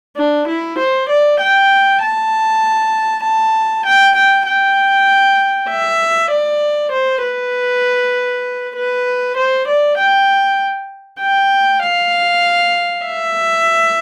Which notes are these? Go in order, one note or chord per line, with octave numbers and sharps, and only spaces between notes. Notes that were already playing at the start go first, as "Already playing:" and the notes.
D4
E4
C5
D5
G5
A5
A5
G5
G5
G5
E5
D5
C5
B4
B4
C5
D5
G5
G5
F5
E5